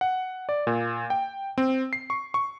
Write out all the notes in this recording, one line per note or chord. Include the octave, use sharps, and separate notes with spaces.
F#5
D5
A#2
G5
C4
C7
C#6
C#6